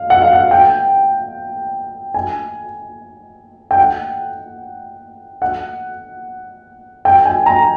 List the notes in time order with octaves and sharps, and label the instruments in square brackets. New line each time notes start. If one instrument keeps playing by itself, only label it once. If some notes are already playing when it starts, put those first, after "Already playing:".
Already playing: [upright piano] F5
F#5
F5
F#5
G5
G#5
G5
F#5
F#5
G5
G#5
A#5